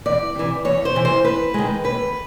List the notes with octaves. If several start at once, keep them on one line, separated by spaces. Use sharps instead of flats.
E2 D5
C3 E3
E2 C#5
C5
C3 E3
C5
D#2 B4
D#3 G#3
D#2 B4